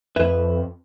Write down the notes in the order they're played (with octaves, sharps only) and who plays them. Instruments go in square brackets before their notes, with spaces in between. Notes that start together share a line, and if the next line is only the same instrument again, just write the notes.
[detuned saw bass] F2 [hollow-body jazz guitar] B4 E5